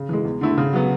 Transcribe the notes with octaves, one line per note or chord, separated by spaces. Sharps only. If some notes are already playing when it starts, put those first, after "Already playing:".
Already playing: C#3
E3 G#3
E2
D3 A3 E4
C#3
F#3 B3